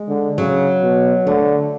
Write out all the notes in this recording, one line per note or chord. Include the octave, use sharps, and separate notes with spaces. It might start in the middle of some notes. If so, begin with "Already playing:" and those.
Already playing: G#3
D3
C#3 F#3
B2
D3 A3